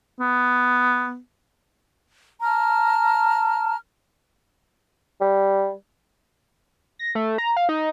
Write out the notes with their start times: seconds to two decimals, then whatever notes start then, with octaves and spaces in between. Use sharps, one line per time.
0.20 B3
2.42 A5 A#5 F6
5.21 G3
6.99 A#6
7.15 A3
7.38 A#5
7.57 F5
7.69 D#4